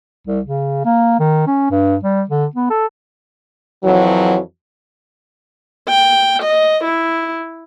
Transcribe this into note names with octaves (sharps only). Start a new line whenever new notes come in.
C2
C#3
A#3
D#3
C#4
G2
G3
D3
B3
A4
F2 E3 F#3
G5
D#5
E4